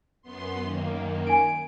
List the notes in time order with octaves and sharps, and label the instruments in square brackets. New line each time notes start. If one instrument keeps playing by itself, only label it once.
[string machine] F#2 B3 C6
F#2 D#3 A#3
[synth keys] G#5 D7